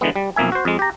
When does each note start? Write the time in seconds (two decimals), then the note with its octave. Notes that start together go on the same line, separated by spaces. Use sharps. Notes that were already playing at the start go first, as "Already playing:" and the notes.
0.01 D3 E3 G#3 B3
0.16 G3
0.36 B1 F2 A#3 E5 G#5
0.52 F#4 C5
0.65 F2 G#3
0.79 G4 A#5